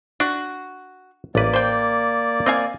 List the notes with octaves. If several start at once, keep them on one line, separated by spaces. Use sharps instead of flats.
D4 F#4
A1 A#3 B4 D5
C5 G5
C4 D#5 F5 G#5